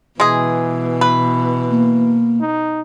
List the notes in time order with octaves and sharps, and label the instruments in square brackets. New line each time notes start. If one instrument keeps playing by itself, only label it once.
[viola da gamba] B2 [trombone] E3 [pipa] G#3 G#4
[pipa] B4
[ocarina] A#3
[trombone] D#4